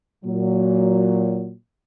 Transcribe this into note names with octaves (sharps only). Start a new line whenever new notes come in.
A#2 F#3